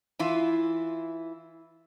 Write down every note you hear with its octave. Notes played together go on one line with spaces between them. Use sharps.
E3 E4 F4